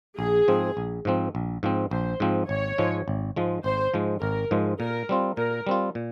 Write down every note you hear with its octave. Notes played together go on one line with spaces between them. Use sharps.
A#1 G#4
G#2 F3 C4
A#1
G#2 F3 C4
A#1
G#2 F3 C4
A#1 C5
G#2 F3 C4
G#1 C#5
G#2 F3 G#3
G#1
G#2 F3 G#3
G#1 C5
G#2 F3 G#3
G#1 A#4
G#2 F3 G#3
A#2 A#4
G3 C4 F4
A#2 A#4
G3 C4 F4
A#2